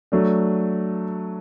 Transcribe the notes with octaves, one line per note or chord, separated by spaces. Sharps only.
F#3 A3 D4